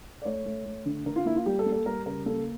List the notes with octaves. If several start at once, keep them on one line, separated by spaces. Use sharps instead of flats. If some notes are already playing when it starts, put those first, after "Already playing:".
D5
A3 C#5
A3
A3
D3
D3 A#4
F4
A#3 E4
F4
G3 G4
A4
A#3
A4
G3 A#4
C#3 A#4
A#3 A4